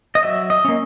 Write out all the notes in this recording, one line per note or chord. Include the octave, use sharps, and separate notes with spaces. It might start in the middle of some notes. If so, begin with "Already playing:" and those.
D#5
F#3 E5
D#5
A#3 C#4